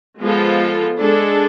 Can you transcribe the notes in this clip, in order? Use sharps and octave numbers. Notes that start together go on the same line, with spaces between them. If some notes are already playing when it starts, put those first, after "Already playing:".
F3 G#3 B3 F4 A4
G#3 D4 A4